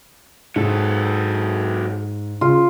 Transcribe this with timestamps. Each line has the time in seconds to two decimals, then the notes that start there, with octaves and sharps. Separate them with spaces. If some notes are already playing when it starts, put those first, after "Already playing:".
0.56 G#2 F#3 A4
2.41 C#3 F4